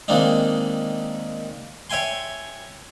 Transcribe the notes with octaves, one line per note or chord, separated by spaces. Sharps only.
D#3 G#3 A#3 C4 D4 D#4
C#5 E5 G5 G#5 C6